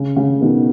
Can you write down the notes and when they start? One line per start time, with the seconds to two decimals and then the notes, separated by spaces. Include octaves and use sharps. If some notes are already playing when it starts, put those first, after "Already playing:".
Already playing: C#3
0.16 C#3
0.41 B2 D#3